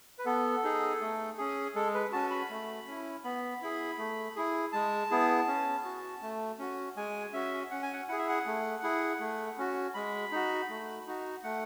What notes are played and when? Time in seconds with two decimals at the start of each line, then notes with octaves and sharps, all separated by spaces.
0.19 B4
0.25 B3 A4
0.64 D#4 G#4
1.01 A3
1.38 C#4 G#4
1.75 G#3 A4
1.94 B4
2.12 C#4 F#4 A5
2.30 B5
2.50 A3
2.87 C#4 E4
3.24 B3 B5
3.62 E4 G#4
3.98 A3
4.36 E4 G#4
4.72 G#3 A5
5.10 B3 E4 G#4
5.47 C#4
5.85 F#4
6.22 A3
6.59 C#4 F#4
6.97 G#3 G#5
7.33 C#4 F#4 E5
7.71 C#4 F#5
7.83 G#5
7.93 F#5
8.08 E4 G#4 F#5
8.18 E5
8.29 F#5
8.46 A3
8.83 E4 G#4
9.20 A3
9.58 C#4 F#4
9.94 G#3 B5
10.32 D#4 F#4
10.69 A3
11.06 D#4 F#4
11.43 A3 F#5